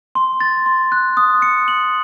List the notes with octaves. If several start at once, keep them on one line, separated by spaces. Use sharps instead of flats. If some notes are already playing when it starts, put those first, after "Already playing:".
C6
A6
C6
F#6
D#6
C#7
F#7